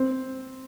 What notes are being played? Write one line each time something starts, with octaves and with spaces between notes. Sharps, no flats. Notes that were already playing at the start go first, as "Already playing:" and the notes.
Already playing: C4